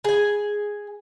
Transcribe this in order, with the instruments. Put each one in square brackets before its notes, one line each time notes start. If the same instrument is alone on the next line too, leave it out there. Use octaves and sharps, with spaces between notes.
[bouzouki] G#4 G#5